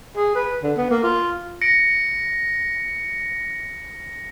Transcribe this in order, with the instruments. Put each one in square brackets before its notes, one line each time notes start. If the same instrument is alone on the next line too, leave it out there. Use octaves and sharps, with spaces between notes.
[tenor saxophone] G#4
B4
D3
B3
A#3
F4
[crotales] A#6 C#7 D7